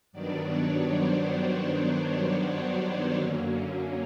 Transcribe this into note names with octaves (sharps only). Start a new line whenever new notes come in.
G2 D#3 F#3 B3 D4 D5
C#5
C5
C#5
F#2 D3 F#3 A#3 C#4